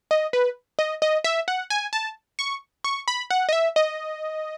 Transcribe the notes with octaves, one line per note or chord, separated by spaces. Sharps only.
D#5
B4
D#5
D#5
E5
F#5
G#5
A5
C#6
C#6
B5
F#5
D#5
E5
D#5